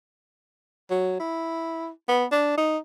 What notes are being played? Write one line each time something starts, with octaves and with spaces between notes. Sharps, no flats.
F#3
E4
B3
D4
D#4